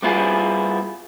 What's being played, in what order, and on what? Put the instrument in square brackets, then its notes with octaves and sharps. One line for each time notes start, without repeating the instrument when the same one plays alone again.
[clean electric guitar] G3 B3 E4 F4 G#4